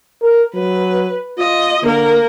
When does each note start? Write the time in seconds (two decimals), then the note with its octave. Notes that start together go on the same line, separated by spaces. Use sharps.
0.23 A#4
0.54 F#3 B4
1.39 F4 D#5
1.83 D3 A#3 A#4